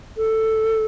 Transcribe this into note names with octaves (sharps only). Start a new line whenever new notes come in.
A4